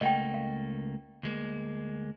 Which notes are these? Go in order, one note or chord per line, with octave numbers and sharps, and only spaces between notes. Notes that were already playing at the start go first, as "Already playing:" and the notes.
C#2 A3 A#3 D#5 F#5 G5
F5
D2 G#3 A#3